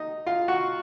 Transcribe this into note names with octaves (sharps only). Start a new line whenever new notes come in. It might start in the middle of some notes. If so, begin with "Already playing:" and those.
Already playing: D#4 D#5
F4 F5
F#4 F#5